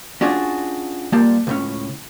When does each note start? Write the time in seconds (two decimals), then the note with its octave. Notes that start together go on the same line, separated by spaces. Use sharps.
0.21 C#4 D4 F4 F#4 G#4
1.12 G3 A#3 F4 G4 D5 A5
1.47 C#2 A2 C#4